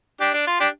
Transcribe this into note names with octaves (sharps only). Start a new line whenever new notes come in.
D4 G4
D4
F4
D4 G4